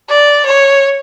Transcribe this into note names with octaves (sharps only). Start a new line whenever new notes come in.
D5
C#5